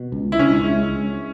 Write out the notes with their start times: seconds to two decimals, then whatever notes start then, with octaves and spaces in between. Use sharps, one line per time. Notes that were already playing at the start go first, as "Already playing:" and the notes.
Already playing: B2
0.12 C#2
0.32 E4
0.39 C#2 C#4
0.65 G#3